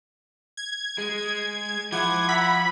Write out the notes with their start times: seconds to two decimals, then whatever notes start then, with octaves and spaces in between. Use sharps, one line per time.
0.57 G#6
0.98 G#3
1.92 F3 E4 F#5 D6 G#6
2.29 E5 F#5 A#5 B5